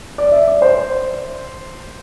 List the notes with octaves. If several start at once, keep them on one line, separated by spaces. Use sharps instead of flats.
D5
E5
D5
C5